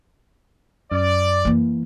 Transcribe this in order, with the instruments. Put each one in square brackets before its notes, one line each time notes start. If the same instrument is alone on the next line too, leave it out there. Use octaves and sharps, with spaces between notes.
[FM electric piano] F#2 [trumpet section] D5
[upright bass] E3 A#3